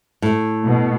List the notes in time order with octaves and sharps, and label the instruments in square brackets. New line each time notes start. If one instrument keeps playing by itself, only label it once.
[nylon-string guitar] A2
[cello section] B2